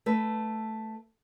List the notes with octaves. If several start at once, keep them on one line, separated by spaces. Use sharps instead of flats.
A3 B4